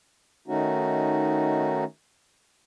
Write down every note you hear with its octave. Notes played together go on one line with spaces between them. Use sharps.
D#3 A3 C#4 D#4 F#4